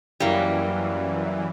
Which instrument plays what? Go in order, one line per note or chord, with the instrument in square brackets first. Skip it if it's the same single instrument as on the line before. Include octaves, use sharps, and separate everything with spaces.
[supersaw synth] F#2 E3 [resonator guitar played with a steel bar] G3 A#3